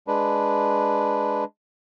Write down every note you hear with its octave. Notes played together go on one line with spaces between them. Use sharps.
G#3 D4 B4